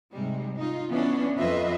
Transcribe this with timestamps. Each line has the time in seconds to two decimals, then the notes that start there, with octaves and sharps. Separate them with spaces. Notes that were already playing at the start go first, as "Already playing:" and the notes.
0.13 G#2 C3 G3 G#3
0.57 D#4 F4
0.90 E3 B3 C#4 D4
1.37 F2 F4 B4 D#5 E5